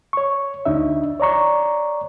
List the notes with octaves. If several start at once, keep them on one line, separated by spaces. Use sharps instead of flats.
C#5 C#6
D2 D4 D#4 E5
C#5 D5 A#5 C#6